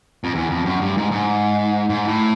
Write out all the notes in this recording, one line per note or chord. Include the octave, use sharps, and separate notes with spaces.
F2
E2
F2
F#2
G2
G#2
G#2
G#2
A2